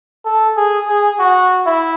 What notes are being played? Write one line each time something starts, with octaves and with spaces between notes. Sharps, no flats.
A4
G#4
G#4
F#4
E4